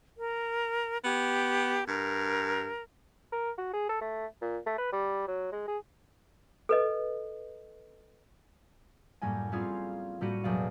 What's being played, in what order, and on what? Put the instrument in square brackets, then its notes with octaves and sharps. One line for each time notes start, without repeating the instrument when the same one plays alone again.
[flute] A#4
[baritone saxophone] B3 [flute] G4
[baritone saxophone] G2 [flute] A#4
[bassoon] A#4
F#4
G#4
A4
A3
A#2
A3
B4
G3
F#3
G#3
G#4
[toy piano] A4 B4 D#5
[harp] F#2 A2 G3 A#3 G#5
G3 C4 C#4 F4 G#4 F5
A2 G3 A#3 F#4 C#7 D#7
E1 E2 F#3 D5 F5